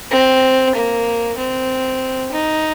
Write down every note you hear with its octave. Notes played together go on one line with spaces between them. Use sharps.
C4
A#3
C4
D#4